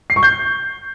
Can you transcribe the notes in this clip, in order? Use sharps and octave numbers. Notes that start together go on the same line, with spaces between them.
C7
C#6
G6